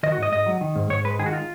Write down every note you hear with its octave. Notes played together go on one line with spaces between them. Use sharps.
D#3 D#5
F#4
G#2 D#5
G#2 D#5
F#3
D#3
G#2
G#2 C#5
G#3 B4
D#3 G#4
F#4
F4